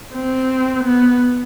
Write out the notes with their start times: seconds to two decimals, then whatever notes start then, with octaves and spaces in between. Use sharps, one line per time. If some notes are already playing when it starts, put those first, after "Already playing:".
0.13 C4
0.84 B3